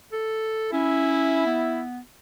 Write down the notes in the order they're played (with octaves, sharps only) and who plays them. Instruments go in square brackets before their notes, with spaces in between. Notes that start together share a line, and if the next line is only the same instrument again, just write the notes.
[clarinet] A4
[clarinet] C#4 [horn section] E4
[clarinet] B3